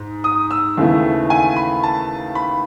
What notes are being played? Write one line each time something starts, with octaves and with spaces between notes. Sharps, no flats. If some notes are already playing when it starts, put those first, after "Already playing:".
Already playing: G#2
D#6
E6
D#2 C#3 E3 A3
G#5
B5
A5
B5